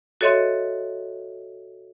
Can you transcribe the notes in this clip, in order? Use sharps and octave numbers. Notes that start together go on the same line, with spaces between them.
F#4 A4 C#5 D#5 E5 C6